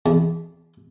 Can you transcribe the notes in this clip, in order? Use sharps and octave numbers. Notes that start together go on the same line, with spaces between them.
E2